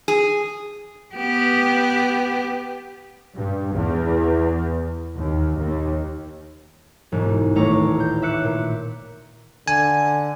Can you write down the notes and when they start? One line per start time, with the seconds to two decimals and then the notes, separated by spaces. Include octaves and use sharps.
0.08 G#4
1.15 B3 G4
3.35 G2
3.73 E2
5.16 D#2
5.56 D#2
7.12 E1 G#2
7.55 D#1 A1 A3 C#5 A#5 D6
8.00 G6
8.22 E5 D6 F#6 C#7
8.44 A#2
9.68 D3 G#5